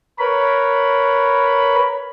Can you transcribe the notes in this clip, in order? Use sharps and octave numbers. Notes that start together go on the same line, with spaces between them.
A#4 B4 C#5 B5